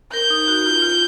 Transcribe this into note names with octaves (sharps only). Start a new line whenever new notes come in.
A#4 G6
D#4
F#4
F4
F4